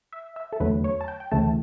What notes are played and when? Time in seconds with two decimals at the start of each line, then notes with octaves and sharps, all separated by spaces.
0.13 E5
0.36 E5
0.53 A4
0.60 E2 D3 F#3 A3 B4
0.84 C#5
1.01 A5
1.08 G5
1.20 G5
1.32 D2 C#3 E3 A3 A5